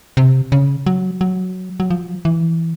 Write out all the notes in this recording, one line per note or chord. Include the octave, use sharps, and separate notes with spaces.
C3
C#3
F#3
F#3
F#3
F3
E3